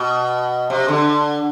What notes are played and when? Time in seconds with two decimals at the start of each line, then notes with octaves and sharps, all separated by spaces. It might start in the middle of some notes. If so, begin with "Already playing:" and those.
Already playing: B2
0.70 C3
0.88 D3